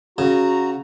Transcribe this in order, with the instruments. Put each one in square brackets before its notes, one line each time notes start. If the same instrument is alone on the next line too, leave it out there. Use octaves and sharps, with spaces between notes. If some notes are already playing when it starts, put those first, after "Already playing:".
[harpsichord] C#3 [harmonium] F#4 A#5